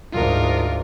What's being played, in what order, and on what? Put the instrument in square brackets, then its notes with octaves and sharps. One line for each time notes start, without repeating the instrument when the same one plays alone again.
[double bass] D2 G#2 [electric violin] F4 A#4